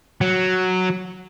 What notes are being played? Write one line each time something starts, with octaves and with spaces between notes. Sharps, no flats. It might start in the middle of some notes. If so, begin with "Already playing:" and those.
F#3